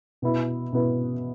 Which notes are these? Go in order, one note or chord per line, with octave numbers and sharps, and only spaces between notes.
B2 B3 E4
B2 B3 E4